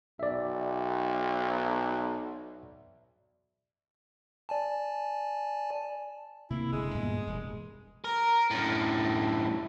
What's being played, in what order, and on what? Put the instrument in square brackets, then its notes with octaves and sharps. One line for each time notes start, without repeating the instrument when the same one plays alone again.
[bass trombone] B1 [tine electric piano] D5 E5
[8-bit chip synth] D5 G#5 A5
[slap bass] C3 A#3 [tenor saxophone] E4
[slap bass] F#1 D3 [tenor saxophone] G#3
[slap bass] G2 A#2 B3
E1 G2
[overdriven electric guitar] A#4
F#2 A2